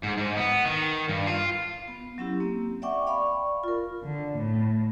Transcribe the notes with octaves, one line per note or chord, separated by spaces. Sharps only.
G#2
G#2
B3
D#3
G2
F4
B3
F#3 C#4 E4 G4
A#3 C4
D5 E5 F#5 G5 C#6 D6
D5 F5 B5 C#6
F4 A#4
D3
A2